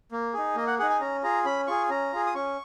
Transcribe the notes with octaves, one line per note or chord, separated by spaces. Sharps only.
A#3
D#4 G#4
A#3 D#5
F#5
D#4 G#4 F#5
G#5
C#4 A#5
F4 G#4 A#5
C#4 B5
F4 G#4 C#6
C#4 A#5
F4 G#4
D#6
C#4 C#6